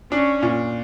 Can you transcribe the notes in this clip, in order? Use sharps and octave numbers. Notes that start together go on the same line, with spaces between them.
C#4 D4
A#2